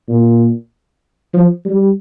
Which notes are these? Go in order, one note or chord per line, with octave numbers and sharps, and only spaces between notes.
A#2
F3
G3